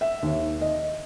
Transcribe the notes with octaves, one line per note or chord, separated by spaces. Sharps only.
E5
D#2
D#5